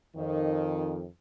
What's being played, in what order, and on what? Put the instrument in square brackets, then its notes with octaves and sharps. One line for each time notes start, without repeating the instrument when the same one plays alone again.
[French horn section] F2 D#3